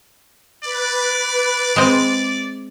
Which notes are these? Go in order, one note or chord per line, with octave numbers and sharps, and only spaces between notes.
B4 D5
G#3 C4